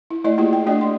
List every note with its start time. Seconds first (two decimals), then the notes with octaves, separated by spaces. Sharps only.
0.11 E4
0.24 A3 E4 D5 D#5 G#5
0.38 A#3 E4 F4 G4 G#4
0.53 G5
0.66 A3 D4 F#4 D5 D#5 G5
0.81 C6